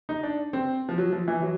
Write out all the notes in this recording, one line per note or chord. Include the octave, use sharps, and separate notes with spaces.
D#4
D4
C4
F3
F#3
F3
E3
F#3